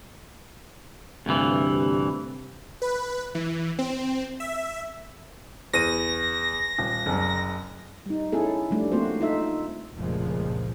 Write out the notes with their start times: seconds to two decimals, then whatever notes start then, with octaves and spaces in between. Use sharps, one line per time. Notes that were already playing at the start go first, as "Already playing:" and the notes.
1.26 D2 G2 C3 E3
2.82 B4
3.35 E3
3.79 C4
4.40 E5
5.73 E2 A#6 D#7
6.79 D#1
7.06 F#1 C2
8.06 G3 D#4
8.32 C#4 E4 G#4 A4
8.71 F3 G3 A3 D4
8.91 A3 A#3 C4 F#4 C5
9.21 D#4 F4 A4 E5
9.94 F1 C#2 A#2 F3 G#3